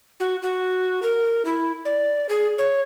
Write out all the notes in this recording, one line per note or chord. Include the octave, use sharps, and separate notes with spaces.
F#4
F#4
A#4
E4
D5
G#4
C#5